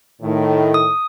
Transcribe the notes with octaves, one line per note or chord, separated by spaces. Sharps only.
A2 D#3
D#6